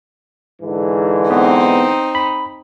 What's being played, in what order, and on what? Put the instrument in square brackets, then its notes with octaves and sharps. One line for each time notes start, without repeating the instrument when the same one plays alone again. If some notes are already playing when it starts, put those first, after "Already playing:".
[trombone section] G#2 D3 E3
[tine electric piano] B3 [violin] C4 D#4
[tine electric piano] B5